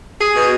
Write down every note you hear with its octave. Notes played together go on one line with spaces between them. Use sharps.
G#4
B2